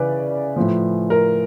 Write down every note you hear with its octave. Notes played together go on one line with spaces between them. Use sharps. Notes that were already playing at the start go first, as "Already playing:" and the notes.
Already playing: C#3 E3 B4 D5
A2 F3
A#4